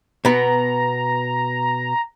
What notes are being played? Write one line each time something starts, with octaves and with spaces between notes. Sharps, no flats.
B2 B3 A#5